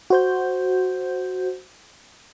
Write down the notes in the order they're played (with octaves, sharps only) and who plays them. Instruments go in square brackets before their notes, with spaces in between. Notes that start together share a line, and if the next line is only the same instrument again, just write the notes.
[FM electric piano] F#4 C5 G6